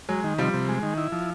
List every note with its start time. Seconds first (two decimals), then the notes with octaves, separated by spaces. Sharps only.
0.09 F#3 G#3
0.24 D#3
0.38 C3 F3 G3
0.54 C3
0.69 G#3
0.83 D#3
0.98 E4
1.12 F3